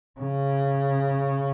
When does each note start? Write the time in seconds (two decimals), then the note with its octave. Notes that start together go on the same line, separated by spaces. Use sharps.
0.20 C#3